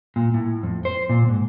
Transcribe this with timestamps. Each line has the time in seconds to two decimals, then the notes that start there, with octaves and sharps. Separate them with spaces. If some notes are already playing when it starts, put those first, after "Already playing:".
0.16 A#2
0.34 A2
0.63 F2
0.85 C5
1.09 A#2
1.29 G#2